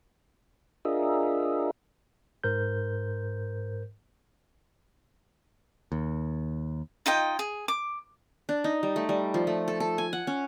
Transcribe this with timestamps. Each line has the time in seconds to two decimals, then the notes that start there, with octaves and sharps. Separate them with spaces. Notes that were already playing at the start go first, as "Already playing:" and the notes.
0.85 D4 F4 G#4 A#4 D#5 E5
2.44 G#2 A#4 C5 G6
5.92 D#2
7.06 D#4 F4 D#5 G5
7.39 G#4
7.68 D6
8.49 D4
8.64 D#4
8.83 G3
8.96 A3
9.09 G3
9.34 F3
9.47 A3
9.68 A4
9.80 A4
9.98 G#5
10.13 F#5
10.27 C#4